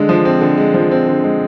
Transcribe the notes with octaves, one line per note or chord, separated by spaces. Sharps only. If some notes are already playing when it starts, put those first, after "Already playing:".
Already playing: D3 G#3
F3
C4
D3
G#3
F3
C4
D3
G#3